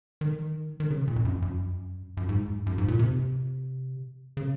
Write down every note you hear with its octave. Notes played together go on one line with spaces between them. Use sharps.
D#3
D#3
C#3
A#2
F2
F#2
F#2
F#2
G#2
F#2
G#2
A#2
C3
C#3